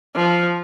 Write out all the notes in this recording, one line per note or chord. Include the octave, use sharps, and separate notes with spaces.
F3